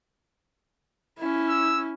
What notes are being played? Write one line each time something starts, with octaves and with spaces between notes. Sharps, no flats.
C#4 E4
E6